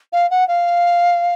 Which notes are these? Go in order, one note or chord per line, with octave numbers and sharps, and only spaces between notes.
F5
F#5
F5